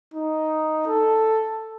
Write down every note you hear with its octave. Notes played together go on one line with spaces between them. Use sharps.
D#4
A4